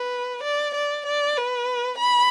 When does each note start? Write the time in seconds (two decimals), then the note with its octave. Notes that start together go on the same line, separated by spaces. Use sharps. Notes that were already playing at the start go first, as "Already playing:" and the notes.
Already playing: B4
0.44 D5
0.75 D5
1.06 D5
1.37 B4
1.98 B5